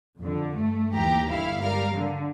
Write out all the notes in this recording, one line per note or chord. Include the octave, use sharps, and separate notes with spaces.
F2 D3
G2 A3
D#2 E3 G4 A#5
G1 G2 E4 F5
G3 A#4 F5
D3